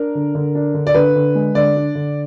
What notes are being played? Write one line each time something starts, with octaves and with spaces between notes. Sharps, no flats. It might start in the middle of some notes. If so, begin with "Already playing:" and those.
Already playing: D4 A#4
D3
D3
D4
D3
D5
D3 B4
D3
G#3
D3 D5
D4
D3